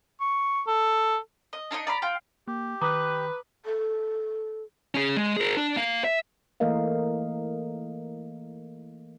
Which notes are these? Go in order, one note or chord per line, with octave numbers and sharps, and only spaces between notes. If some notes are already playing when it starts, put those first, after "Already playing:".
C#6
A4
D#5
D4 D#4 C5 D#5
D5 A#5 B5
F4 G5
A#3 G4
D#3 B4 A#5 D6 D#6
A4
C#4 G#4
G#3
G#4 A#4
D4
A#3 F5
E5
E3 A3 A#3 A#4 D#5 F5